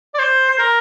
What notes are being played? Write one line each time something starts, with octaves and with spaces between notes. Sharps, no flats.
D5
C5
C5
A#4